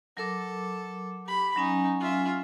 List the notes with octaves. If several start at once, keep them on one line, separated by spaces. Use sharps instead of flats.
F#3 A4 A#4 D6
G4 B5
F#3 C#4 D#4 G#5
F4 E5